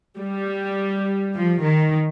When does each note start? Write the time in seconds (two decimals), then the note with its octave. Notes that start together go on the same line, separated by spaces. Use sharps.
0.18 G3
1.35 F3
1.64 D#3